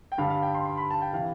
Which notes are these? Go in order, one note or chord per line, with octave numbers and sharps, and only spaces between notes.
G5
G2 D3 G3 F5
F5
G5
C6
C6
B5
A5
G5
C3 E3 F5